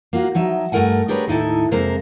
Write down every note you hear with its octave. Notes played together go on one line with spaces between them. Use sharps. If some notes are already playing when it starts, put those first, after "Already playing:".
A#3 F4 F#4
F3 F#3 D#4 E5
G2 A3 F#4 A#4 F#5 G#5
D4 G4 G#4 A#4 B4 C#5
D#2 A2 D#4 E4 A4 E5
F2 C3 G#3 A#3 A#4 C5